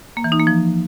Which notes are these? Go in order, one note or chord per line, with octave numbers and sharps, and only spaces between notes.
A#3
E3
D#4
A#3
F3